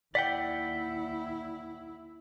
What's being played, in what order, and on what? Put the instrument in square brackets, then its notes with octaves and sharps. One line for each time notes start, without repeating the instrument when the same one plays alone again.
[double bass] D#2 E4 [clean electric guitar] D5 F#5 G5 [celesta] B6